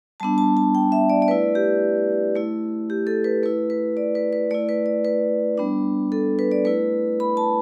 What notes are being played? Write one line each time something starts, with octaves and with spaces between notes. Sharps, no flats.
G3 B3 D4 A5
A5
A5
G5
E5
D5
D5
A3 E4 B4
G4
A3 E4
G4
A4
B4
A3 E4 B4
B4
D5
B4
B4
A3 E4 D5
B4
D5
B4
G3 B3 D4
A4
B4
D5
A3 E4 B4
B5
A5